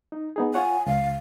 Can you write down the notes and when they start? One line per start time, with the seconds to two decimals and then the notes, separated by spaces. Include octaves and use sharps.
0.12 D#4
0.36 B3 D#4 G#4
0.54 F4 C#5 F#5 G#5
0.86 C#2 F5